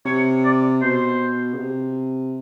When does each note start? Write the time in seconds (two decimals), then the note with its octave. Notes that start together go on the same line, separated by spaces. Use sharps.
0.05 C3 C#5
0.44 D5
0.82 B2 C5
1.54 C#3
1.58 C3